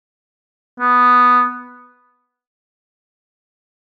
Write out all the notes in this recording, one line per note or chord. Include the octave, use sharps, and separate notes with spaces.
B3